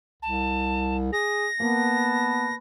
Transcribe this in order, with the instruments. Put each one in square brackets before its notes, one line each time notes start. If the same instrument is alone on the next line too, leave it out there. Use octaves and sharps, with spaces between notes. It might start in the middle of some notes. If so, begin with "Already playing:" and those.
[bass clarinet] C2 [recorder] A5
[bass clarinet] G#4 [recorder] A#6
[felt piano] A#3 [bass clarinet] B3 [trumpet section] B4 A5